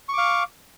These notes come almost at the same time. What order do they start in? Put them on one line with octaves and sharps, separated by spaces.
C#6 D6 F5